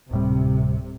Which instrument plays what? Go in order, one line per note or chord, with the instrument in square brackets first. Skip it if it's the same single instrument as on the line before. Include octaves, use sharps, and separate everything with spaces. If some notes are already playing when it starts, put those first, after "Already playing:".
[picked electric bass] D1 A2 G3 [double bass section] C3